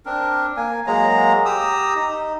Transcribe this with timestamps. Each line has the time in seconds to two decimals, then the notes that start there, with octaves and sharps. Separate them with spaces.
0.06 C4 D4 A#4
0.57 A#3 G#5
0.87 F#3 G#3 A#3 A#5
1.45 G4 A#5 D#6 E6
1.96 D#4